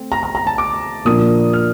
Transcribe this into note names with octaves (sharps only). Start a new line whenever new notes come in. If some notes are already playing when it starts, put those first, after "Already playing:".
Already playing: A3 C4
A#5
A#5
A#5
A5
D6
A#2 F3 A#3 D4 D#6
F6